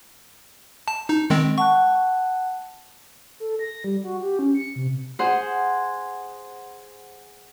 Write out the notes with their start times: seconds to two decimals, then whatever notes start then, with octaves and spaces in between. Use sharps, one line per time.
0.88 A5
1.09 D#4
1.30 D#3 G#3 C4
1.58 F#5 A5 C#6 F#6
3.40 A4
3.59 A#6
3.84 G3
4.04 F#4
4.22 G4
4.39 C#4
4.55 C#7
4.76 C3
5.19 G#4 C5 F#5 C6 F#6